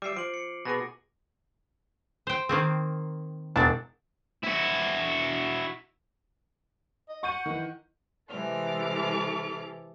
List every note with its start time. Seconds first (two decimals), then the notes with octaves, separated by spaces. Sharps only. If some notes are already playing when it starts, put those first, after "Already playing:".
0.02 G3 E5 D6 C7 D7
0.17 F3 D7 F#7
0.34 C#7
0.65 B2 B3 G#4 D6 A#6
2.27 C5 G5
2.49 D#3 A#3 C4
3.56 E1 D4 A6
4.44 E4 F#4
7.09 D#5
7.23 F#5 C#6 G6 D#7
7.46 D#3 E3
8.30 C3 E3 G#3 A4 D6 F6